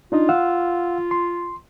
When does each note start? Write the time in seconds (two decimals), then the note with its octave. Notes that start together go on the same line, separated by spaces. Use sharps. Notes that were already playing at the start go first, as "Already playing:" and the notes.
0.12 D4 D#4 F4 D#5
0.29 F5 F#5 E6
1.11 C6